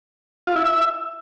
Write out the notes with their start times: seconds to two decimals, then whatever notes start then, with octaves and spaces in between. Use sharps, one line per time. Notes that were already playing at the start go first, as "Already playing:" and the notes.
0.47 F4
0.56 E4
0.64 E5